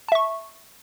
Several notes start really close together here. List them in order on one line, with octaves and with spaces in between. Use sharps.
A5 E5 C#6